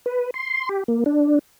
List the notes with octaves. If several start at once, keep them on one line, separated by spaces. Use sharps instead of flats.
B4
C6
G4
A#3
D4